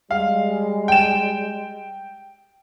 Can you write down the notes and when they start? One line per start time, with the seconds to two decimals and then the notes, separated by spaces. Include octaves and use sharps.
0.11 G3 G#3 F5
0.88 G5 E7